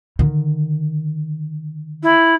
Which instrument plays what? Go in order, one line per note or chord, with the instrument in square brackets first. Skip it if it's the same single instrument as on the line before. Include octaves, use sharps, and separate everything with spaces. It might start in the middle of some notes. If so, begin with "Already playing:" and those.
[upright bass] D3 D#3
[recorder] E4